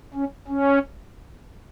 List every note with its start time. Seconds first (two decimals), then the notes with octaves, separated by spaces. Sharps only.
0.14 C#4
0.48 C#4